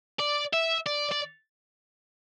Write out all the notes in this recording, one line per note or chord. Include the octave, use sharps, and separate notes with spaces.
D5
E5
D5
D5